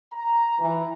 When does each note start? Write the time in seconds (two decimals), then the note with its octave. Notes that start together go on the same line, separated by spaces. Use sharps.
0.12 A#5
0.59 E3